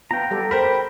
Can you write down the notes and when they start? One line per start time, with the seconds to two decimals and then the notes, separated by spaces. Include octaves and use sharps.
0.11 B3 F4 G5 A#5
0.31 G3 G4 A4
0.51 A#4 C5 G5 B5